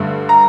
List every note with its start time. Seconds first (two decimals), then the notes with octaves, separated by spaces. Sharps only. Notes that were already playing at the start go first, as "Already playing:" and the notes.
Already playing: G2 D3 A3
0.29 A#5